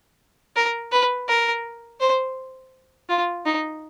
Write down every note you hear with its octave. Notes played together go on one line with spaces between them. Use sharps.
A#4
B4
A#4
C5
F4
D#4